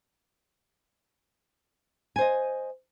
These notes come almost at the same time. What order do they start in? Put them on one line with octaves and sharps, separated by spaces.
G#5 C5 D#5